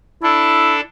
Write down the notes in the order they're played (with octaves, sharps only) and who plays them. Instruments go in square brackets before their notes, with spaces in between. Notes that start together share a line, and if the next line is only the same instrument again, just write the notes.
[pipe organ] D4 A4 [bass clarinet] E4